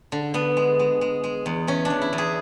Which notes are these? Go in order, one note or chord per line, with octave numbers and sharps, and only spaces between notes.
D3
D3 B3
G#3
G#3
G#3
G#3
E2
E3 C#4
D4
E2
E4
E2
G#4